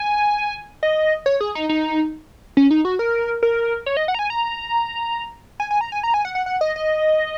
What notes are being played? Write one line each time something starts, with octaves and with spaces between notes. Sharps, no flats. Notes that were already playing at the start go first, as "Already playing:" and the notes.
Already playing: G#5
D#5
C#5
G#4
D#4
D#4
C#4
D#4
F#4
A#4
A#4
C#5
D#5
F#5
A#5
G#5
A#5
G#5
G#5
A#5
G#5
A#5
G#5
F#5
F#5
F#5
D#5
D#5